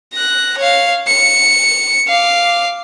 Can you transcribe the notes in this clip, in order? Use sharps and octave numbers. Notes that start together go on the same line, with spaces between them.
F#6 A#6
C#5 F5
C#7
F5 D6